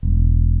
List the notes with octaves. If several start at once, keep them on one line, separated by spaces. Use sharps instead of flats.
E1